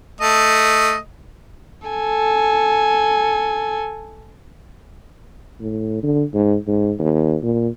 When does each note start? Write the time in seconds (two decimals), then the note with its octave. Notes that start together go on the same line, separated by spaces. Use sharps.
0.21 A3 D#5
1.88 A4 G#5
5.60 A2
6.03 D3
6.34 G#2
6.67 G#2
6.99 D#2
7.43 A#2